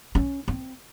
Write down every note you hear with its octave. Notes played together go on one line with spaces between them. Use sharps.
C#4
C4